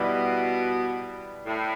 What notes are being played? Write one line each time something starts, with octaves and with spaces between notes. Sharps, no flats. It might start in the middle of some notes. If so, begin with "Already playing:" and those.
Already playing: B2 G3 E4 B4 D5
A2